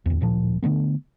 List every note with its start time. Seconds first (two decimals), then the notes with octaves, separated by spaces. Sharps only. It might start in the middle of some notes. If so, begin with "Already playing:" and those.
0.06 D1 E2
0.21 D1 A#2 F3
0.63 D3 E3 A3 B3